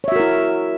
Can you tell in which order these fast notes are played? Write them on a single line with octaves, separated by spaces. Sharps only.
C#5 E5 F#4 A#4 E4